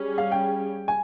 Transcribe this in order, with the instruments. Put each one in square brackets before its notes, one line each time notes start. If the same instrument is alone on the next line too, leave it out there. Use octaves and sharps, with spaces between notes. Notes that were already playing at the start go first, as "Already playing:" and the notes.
Already playing: [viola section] G3 C#4 G#4
[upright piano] F5
G5
G#5